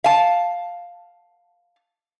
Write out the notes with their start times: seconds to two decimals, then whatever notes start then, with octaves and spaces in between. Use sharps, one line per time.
0.04 F5 A5